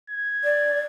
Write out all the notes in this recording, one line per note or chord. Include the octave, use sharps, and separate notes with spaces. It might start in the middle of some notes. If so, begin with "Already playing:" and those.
G#6
D5